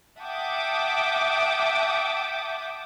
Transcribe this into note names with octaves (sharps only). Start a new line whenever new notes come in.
E5 F#5 G5 A5 D6 D#6